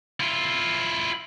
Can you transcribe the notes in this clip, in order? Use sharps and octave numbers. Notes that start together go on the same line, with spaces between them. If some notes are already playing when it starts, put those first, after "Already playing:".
E4 F4